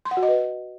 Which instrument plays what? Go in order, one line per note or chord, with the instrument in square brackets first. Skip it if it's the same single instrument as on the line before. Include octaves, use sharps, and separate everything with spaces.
[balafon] C6
F#5
F#4
D#5
B4